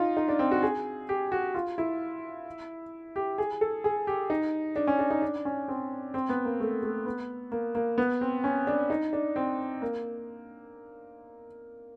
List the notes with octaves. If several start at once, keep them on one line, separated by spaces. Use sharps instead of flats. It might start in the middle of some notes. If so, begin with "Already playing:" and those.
Already playing: D#4 F4
D#4
D4
C4
F#4
G#4
G4
F#4
F4
E4
G4
G#4
A4
G#4
G4
D#4
D4
C#4
D4
D#4
D4
C#4
C4
C4
B3
A#3
A3
A3
B3
A#3
A#3
B3
C4
C#4
D4
D#4
D4
C4
A#3